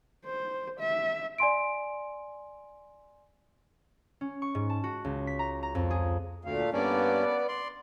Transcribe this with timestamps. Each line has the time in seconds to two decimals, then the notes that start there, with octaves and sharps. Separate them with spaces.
0.25 C5
0.79 E5
1.38 D5 G#5 C6 D7
4.21 C#4
4.42 C#6
4.55 G#2
4.70 A5
4.84 F#4
5.05 C#2
5.27 B6
5.39 A#5
5.63 A#5
5.75 F2
5.90 G#4
6.45 D2 A#2 A3 F5
6.73 G2 A#3 B3 C#4 D5
7.48 D5 C6